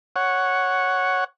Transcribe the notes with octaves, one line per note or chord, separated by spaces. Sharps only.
C#5 F#5